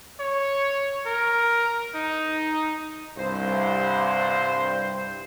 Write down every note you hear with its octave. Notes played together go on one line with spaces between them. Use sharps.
C#5
A#4
D#4
C2 G2 C5